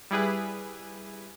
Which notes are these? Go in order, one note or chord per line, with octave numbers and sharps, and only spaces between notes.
G3 E4 G#4 B4